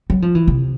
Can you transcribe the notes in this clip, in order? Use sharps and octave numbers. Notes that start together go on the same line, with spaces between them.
F#3
F3
E3
C3